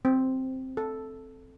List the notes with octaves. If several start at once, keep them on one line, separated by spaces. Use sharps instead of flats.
C4
A4